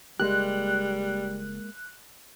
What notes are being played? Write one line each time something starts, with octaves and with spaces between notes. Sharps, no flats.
F#1 G3 G#3 A#3 G4 F#6